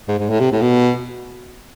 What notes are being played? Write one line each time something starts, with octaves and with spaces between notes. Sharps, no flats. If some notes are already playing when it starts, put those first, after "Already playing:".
G#2
G#2
A2
C3
A2
B2